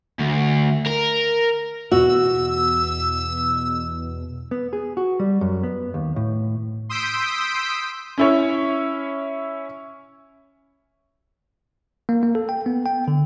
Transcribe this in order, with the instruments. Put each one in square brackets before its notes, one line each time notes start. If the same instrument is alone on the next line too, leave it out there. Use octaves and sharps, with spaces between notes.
[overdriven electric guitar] D2
A#4
[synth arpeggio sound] E2 B2 [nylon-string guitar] F#4 [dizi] E6
[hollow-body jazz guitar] B3
G#4
F#4
G3
F#2
B3
D#2
A2
[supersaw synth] C6 D#6 E6 G6 B6 D7
[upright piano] C#4 E4 C#5
[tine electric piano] A#3
A#3
A4
G5
B3
G5
D3